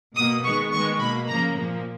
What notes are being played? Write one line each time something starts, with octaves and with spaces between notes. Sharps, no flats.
B2 A#3 D#6
D#3 G#3 B3 C#6
D#3 G#3 B3 C#6
B2 A#3 B5
C#3 F3 A#3 A#5
A#2 F3 A#3